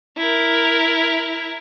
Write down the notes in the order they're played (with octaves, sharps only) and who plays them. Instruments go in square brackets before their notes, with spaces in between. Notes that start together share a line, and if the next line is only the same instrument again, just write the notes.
[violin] E4 A#4